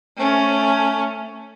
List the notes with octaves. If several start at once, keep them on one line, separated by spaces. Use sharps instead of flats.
A3 C#4